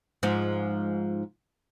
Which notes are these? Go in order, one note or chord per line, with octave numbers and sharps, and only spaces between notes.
G#2 F3